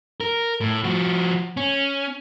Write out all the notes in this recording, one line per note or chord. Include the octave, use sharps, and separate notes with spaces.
A#4
A2
F3 F#4
C#4